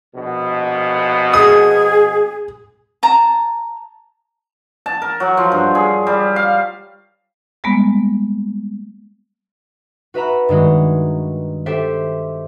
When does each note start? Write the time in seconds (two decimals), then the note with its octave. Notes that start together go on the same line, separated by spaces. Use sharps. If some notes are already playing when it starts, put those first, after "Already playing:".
0.15 A#1 B2
1.34 G#4 D#6
3.03 A5 A#5
4.86 A5
5.02 A#4
5.20 F#3
5.37 F3
5.52 G2
5.75 G#4
6.07 G3
6.36 F5
7.64 G3 G#3 A#3 B3
10.14 F#4 B4 E5 A#5 B5
10.49 G2 D#3 G#3 F#4
11.66 G4 A4 C5 E5